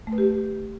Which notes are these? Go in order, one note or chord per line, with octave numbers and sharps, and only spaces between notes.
A3
B4
G4